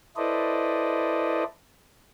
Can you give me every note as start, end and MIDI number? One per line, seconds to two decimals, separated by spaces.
0.16 1.44 64
0.16 1.44 69
0.16 1.44 71
0.16 1.44 72
0.16 1.44 74
0.16 1.44 75